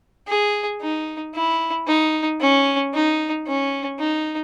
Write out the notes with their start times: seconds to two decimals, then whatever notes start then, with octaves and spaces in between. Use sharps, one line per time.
0.28 G#4
0.81 D#4
1.35 E4
1.87 D#4
2.40 C#4
2.93 D#4
3.47 C#4
3.99 D#4